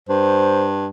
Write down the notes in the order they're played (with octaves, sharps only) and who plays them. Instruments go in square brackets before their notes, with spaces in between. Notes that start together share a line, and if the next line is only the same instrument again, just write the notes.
[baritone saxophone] G2 [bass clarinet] C5